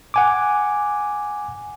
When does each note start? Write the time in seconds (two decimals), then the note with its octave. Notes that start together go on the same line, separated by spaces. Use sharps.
0.14 F#5 G#5 D6